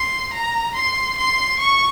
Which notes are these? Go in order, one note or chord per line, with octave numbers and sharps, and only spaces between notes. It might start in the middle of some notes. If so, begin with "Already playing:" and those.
Already playing: C6
A#5
C6
C6
C#6